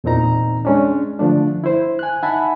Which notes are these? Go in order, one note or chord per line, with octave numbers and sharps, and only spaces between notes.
E2 A#2 C4 D#4 A#5
G#3 C#4 D4
D3 F3 A3 D4
E4 C5
G#5 F#6
D#4 E5 F#5 G#5 A5 B5